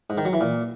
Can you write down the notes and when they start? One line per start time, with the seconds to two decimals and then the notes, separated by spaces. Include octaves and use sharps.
0.10 G#2
0.18 D#3
0.25 F#3
0.33 E3
0.41 A#2